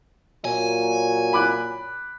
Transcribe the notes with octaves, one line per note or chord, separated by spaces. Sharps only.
A#2 F#3 G#5
B5 D6 F#6